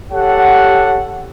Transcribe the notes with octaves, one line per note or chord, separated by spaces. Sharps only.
G4 A4 C#5 F#5